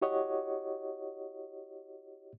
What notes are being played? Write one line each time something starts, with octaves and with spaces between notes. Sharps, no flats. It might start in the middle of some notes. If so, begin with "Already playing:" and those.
E4 F#4 G4 C#5 D#5 F#5